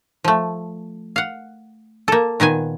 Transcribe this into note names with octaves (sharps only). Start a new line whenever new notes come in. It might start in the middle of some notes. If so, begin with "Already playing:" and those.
F3 A3
F5 F#5
A#3 A4
A#2 D#3 B3 G#5